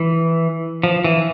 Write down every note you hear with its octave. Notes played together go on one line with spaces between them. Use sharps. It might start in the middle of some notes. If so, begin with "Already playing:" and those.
Already playing: E3
F3
E3